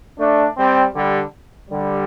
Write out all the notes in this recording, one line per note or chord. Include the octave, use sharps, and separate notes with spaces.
A3 D4
G3 C4
D3 G3
D3 G3